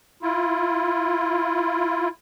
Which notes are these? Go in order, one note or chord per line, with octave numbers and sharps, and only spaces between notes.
E4 F4